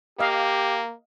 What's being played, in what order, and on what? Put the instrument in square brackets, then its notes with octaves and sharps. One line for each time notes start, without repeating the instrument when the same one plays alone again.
[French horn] A#3 [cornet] G4 [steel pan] D#5 F5